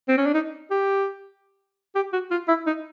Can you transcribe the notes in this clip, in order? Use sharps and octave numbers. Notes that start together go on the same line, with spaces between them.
C4
C#4
D4
D#4
G4
G4
F#4
F4
E4
D#4